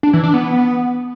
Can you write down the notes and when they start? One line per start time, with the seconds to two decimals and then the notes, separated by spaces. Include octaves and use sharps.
0.03 D4
0.13 E3
0.24 D4
0.34 B3